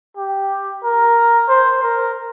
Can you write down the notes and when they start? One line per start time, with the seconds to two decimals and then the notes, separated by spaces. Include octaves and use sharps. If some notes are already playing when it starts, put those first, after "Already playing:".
0.17 G4
0.84 A#4
1.49 C5
1.83 A#4